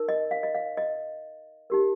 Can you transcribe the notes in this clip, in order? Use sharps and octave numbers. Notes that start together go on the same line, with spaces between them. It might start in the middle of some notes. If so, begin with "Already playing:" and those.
Already playing: D#4 A#4
D#5
F5
D#5
F5
D#5
D#4 G4 A#4